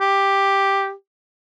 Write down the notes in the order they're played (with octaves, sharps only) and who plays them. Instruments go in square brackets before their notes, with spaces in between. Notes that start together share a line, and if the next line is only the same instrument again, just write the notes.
[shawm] G4